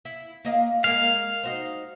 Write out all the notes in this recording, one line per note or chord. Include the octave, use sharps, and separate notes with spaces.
E4
A#3 D#5 F5
G#3 A#3 A#4 F5
D#4 F#4 C5